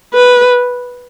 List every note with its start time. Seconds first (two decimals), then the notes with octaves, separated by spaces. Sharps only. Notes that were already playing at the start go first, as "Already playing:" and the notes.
0.14 B4